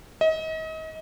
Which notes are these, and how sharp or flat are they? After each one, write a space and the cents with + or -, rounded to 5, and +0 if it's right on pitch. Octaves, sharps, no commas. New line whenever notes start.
D#5 +35